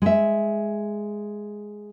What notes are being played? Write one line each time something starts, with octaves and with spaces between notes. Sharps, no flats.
G#3 E5